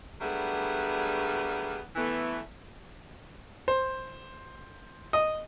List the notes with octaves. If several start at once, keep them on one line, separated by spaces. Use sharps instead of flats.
F#3 G3 A3 B3 D4 G#4
E3 A3 B3
C5
D#5